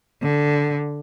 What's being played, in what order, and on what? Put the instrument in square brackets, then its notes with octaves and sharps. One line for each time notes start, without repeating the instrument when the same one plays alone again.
[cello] D3